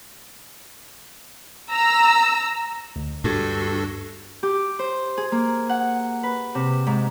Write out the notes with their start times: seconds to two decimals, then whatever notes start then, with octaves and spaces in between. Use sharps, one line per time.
1.69 A#5 E6
2.96 D2
3.24 G2 D4 F#4 A4
4.43 G4
4.79 C5
5.17 G#4
5.32 A#3
5.69 F#5
6.23 B4
6.55 C3
6.87 G#2